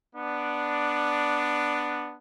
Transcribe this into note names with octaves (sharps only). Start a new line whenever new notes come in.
B3 D4